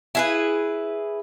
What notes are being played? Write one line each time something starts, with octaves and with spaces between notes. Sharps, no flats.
E4 G#4 B4